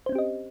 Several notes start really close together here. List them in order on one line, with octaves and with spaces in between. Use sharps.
C5 C#4 C4 G4 D#5